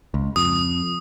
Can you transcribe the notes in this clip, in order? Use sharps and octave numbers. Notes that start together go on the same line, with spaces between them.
C#2
F2 D#6